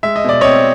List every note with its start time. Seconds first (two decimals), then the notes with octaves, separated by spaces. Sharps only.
0.03 G#3 E5
0.16 D#5
0.24 B2 D5
0.41 C4 C#5 D#5